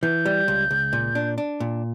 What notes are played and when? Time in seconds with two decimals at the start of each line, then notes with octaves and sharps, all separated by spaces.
0.03 E3 G6
0.25 G3
0.48 C#2
0.71 C#2
0.93 A#2
1.15 D4
1.38 D4
1.60 A#2